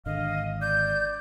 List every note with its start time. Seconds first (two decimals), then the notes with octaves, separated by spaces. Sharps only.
0.06 G#1 D3 D#5 F5
0.62 D5 G6